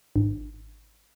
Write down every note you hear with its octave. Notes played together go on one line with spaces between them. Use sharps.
G#1